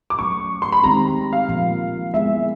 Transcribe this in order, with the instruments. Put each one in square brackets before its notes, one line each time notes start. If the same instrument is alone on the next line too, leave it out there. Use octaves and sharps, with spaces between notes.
[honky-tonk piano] D6
[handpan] F#3 A3 C#4 [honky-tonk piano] C#6
[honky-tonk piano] C6
B5
[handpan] D#3 G#3 C4 D#4 G4 [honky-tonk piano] A#5
[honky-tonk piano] F5
[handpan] A#2 F3 A#3
[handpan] G#3 B3 E4 G#4 [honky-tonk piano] E5